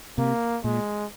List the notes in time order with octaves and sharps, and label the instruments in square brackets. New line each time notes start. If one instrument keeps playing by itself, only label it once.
[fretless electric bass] C3 [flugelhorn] A#3
[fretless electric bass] A#2 [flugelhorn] G#3